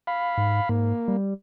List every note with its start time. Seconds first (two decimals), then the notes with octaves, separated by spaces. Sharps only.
0.07 F5 B5
0.38 G#2
0.69 G#2 A#3
1.08 G3